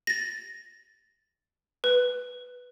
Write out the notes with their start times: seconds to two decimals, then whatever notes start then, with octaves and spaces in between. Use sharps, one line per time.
0.07 A6 A#6
1.84 B4